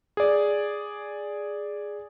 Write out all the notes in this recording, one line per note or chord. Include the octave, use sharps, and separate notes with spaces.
G#4 D5